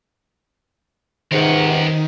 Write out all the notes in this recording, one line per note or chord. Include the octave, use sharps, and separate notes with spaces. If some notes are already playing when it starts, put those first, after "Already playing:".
C#2 G#2 C3 D#3 A#4 F#5